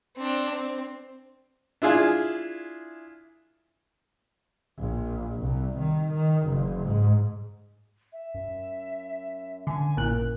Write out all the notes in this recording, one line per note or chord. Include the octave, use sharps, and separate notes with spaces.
C4 D4
C4
D4 E4 F4 G#4
A#1
C2
D#3
D#3
F#1
G#2
E5
F#2
D3 G#5
A1 A#2 A#4 F#6